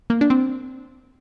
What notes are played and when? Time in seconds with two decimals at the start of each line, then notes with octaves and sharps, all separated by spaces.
0.10 A#3
0.21 D4
0.30 C4